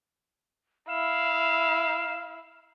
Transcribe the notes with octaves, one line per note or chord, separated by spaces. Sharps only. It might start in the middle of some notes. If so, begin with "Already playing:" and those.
E4 F5 E7